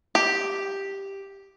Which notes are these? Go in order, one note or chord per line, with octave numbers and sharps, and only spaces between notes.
G4